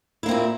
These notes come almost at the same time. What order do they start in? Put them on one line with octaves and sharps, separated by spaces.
E4 A#3 C4 A#2